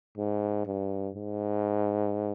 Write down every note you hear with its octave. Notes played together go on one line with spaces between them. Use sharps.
G#2
G2
G#2